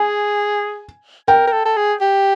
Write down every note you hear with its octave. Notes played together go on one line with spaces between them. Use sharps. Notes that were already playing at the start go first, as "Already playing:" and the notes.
Already playing: G#4 G#5
A#4 G5
A#4
A4
A4
G#4
G4